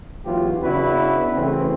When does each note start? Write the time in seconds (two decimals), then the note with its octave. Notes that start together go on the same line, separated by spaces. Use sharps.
0.24 G#1 D#2 E3 F#3 F4 G4
0.62 C#3 B3 D4 E4 F#4 B4
1.35 C#3 E3 A3 C4